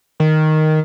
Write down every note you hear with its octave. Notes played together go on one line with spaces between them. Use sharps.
D#3